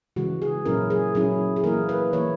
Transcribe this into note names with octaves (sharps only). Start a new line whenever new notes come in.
C#3 E3 G#3 F#4
G#4
A#2 F#3 C#4 E4 A#4
G#4
A#2 F#3 C#4 E4 G#4
G#4
E3 A#3 E4 A#4
B4
E3 A#3 E4 C#5